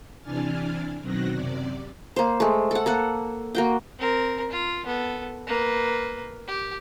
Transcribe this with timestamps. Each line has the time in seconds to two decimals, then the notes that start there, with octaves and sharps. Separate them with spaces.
0.22 C3 E3 D4 G#5 F6 A6
1.01 B2 D#3 F#3 C4 F#6 A#6
1.31 F#2 C3 D5
2.16 A#3 C5
2.40 G#3 A3
2.71 A4 F#5
2.86 A#3 A4 F#5
3.55 A#3 F#4 G5
3.99 C4 A#4
4.50 F4
4.86 B3 A4
5.47 A#3 B4
6.48 G4